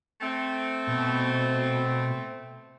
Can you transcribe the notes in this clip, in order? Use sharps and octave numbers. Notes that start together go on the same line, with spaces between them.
A3 C4
B2